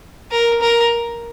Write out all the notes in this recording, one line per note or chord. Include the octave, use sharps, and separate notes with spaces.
A#4
A#4